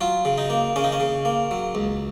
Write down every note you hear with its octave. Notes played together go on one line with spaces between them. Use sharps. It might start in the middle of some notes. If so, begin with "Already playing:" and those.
F#3 F4
C#3
D#4
A#3
C#3 C#4
D#4
C#4
C#3
A#3
F#3
C#2